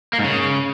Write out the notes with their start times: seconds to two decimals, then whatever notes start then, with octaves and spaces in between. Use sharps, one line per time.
0.13 A#3
0.19 G#2
0.24 C#3